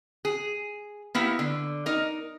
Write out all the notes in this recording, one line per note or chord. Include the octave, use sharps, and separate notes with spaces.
G#4
A#3 B3 E4 G4
D3
D#4 A#4